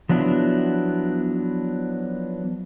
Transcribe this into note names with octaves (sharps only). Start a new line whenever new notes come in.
F3 F#3 B3 D4 E4